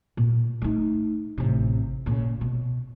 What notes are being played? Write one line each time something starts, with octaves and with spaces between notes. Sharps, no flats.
A#2
A3 D#4
A1 C3
A#2 C#3
B2